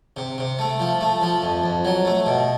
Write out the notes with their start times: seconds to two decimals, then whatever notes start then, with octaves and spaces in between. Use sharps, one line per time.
0.16 C3
0.38 C3
0.59 A3
0.80 F3
1.01 A3
1.22 F3
1.42 F2
1.64 F2
1.85 F#3
2.05 A3
2.26 B2